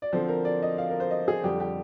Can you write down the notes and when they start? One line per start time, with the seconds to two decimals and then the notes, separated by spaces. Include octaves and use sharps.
0.02 D5
0.12 D3 F3 C4 C5
0.28 A#4
0.45 D5
0.62 D#5
0.78 F5
0.90 A#4
1.00 C5
1.11 D#5
1.28 G#4
1.44 F2 D3 G3 G4
1.60 G4